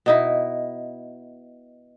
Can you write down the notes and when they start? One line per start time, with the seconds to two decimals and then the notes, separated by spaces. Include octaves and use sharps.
0.06 B2 D#4 E4